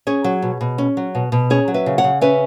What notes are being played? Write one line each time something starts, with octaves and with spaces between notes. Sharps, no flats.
C#4 G#4 C#5
F#3
B2
B2
C#4
F#3
B2
B2
C#4 G#4 C#5
F#3
B4 E5
C#3
C#5 F#5
C#3
C#4 B4 E5